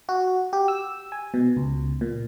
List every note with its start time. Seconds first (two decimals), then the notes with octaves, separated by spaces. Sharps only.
0.09 F#4
0.53 G4
0.68 E6
1.12 G#5
1.34 B2
1.57 C#2
2.01 A#2